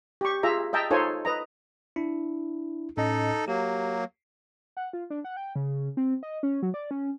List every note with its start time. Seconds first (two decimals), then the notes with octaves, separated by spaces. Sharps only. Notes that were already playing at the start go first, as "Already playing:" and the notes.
0.21 G4 C#6
0.43 F4 G#4 E5 A#5
0.73 D#5 E5 G5 A5 A#5
0.91 D#4 F4 A4 C5 C#5 G#5
1.25 B4 D#5 A#5
1.96 D4 E4
2.97 A2 C#4 D#4 A4 D#5
3.48 F#3 A#3 G4
4.77 F#5
4.93 F4
5.10 D4
5.24 F#5
5.37 G5
5.56 C#3
5.97 C4
6.23 D#5
6.43 C#4
6.62 F#3
6.74 D5
6.91 C#4